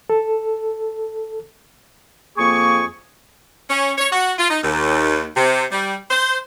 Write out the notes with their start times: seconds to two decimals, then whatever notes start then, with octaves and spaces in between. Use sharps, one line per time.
0.10 A4
2.37 F2 A#3 G#4 C#6
3.70 C#4
3.98 C#5
4.12 F#4
4.39 F4
4.50 D#4
4.63 D#2
5.36 C3
5.71 G3
6.11 C5